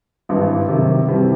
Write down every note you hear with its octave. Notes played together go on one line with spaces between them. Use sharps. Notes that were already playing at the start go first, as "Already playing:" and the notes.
G#1 G2 E3
C3 D#3 F#3
C2 C3 E3 G3